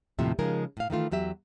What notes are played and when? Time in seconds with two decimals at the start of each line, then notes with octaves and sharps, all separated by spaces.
0.19 D#2 A2 C3 F3 E5
0.39 C#3 F3 G#3 D#4 G#4 A#4
0.77 A2 F5
0.90 D#3 E3 A3 F4
1.11 E2 F#3 G4 E5